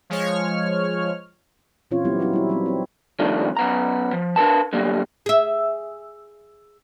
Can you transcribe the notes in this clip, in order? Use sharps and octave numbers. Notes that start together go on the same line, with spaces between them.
F3 G#3 C#5 F6
A#2 E3 C4 C#4 F4 C#5
F#3 G3 B3 C4 E4 G4
F#3 C4 D#4 E4 F#4
G3 E4
F#3 G3 B3 C4
C4 C#5
G2 C3 D#3 F3 A3 D4
F#2 B3 A#5
F3
D4 A#4 B4 A5
D3 F#3 G3 A#3
G#4 E5